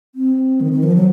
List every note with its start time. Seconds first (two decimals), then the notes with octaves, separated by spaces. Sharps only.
0.15 C4
0.61 D#3
0.72 D#3
0.83 F3
0.95 F#3